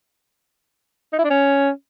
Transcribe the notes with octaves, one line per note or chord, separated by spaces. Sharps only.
D#4
E4
D4
C#4